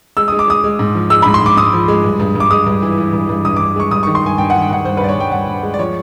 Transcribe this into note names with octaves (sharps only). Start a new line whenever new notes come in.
G#3 E6
G#3 D#6
D6
G#3 D#6
G#3
G#2
F3
G#3 E6
B5
G#2
C6
G#2 D6
G#2 D#6
F3
G#3
G2
G2
G2 D6
G#3 D#6
G2
E3
E3
G2
G2
G2 D#6
D6
G2
G#3 C#6
G2 D#6
C#6
D#3
C6
G2 G#5
G2 G5
F#5
D#3
G5
G2 F#5
G2 C5
B4
G2 D5
C#5
G2 G5
G2 F#5
G2
G#3
D5
F3 C#5